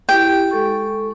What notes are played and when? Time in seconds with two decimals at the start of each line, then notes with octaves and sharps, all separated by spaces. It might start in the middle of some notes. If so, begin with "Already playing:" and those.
0.09 E4 G4 G5
0.51 G#3 A4 C#6